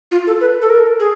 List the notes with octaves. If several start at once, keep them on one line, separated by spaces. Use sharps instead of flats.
F4
A4
B4
A4
A#4
G#4